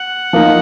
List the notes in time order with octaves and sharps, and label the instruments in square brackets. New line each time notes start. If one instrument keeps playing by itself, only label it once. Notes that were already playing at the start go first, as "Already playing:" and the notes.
Already playing: [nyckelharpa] F#5
[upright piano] F3 A#3 D#4